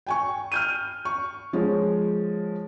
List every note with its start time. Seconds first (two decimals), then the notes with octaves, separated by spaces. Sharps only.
0.07 G5 G#5 C#6
0.52 F6 G6 D#7
1.05 C#6
1.53 F3 G#3 C#5